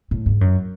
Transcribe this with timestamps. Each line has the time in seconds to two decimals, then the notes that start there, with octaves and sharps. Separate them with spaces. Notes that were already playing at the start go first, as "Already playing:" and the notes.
0.11 A2
0.26 G#2
0.41 F#2